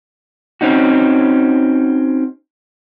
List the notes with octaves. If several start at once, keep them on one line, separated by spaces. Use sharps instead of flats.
C4 C#4 D#4 F#4